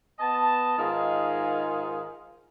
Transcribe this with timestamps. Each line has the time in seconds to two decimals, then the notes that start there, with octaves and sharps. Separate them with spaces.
0.19 B3 D#5 A5
0.79 G#2 D#3 F4 G#4